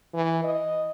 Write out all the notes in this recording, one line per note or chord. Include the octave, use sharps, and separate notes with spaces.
E3
D#5